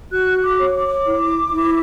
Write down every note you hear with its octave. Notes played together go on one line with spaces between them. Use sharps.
F#4 F#6
D6
C#5
D6
E4
E4